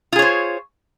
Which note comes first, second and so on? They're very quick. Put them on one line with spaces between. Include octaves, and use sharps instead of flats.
F4 G#4 C#5 C5